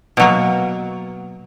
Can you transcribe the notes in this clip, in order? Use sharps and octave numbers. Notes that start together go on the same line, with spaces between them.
B2 F#3 A#3